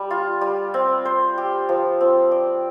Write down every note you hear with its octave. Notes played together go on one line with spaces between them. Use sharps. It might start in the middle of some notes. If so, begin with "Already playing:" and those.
Already playing: G3
F4
G3
C4
C5
G4
F3
C4
D5